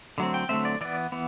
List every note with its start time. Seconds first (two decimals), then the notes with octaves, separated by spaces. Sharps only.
0.18 D3 F#3 A3 C4
0.34 G5
0.49 D3 F#3 A3 C4 E5
0.65 D5
0.81 E3 B3 D5
1.12 E3 B3